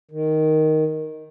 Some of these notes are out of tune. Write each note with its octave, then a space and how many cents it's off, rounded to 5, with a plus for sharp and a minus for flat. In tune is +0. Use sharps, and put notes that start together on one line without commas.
D#3 +0